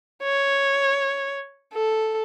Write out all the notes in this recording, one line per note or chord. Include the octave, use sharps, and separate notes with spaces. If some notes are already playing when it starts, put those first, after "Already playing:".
C#5
A4